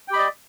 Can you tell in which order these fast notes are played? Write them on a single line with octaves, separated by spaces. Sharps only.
G5 G4 B5 D#5 D5